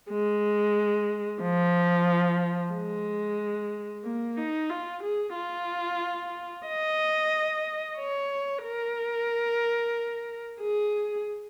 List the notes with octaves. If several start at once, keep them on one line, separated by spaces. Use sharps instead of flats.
G#3
F3
G#3
A#3
D#4
F4
G#4
F4
D#5
C#5
A#4
G#4